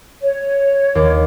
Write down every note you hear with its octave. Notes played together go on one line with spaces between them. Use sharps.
C#5
D#2